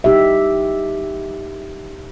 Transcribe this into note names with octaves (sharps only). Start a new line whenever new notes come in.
D#4 G4 E5